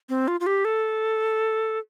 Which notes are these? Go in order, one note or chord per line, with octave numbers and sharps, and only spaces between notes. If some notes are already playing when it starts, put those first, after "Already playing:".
C4
F4
F4
G4
A4